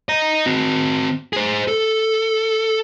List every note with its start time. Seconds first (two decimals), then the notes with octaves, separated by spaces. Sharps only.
0.09 D#5 A#5
0.46 C4 F#4
1.33 G#4 C5
1.68 A4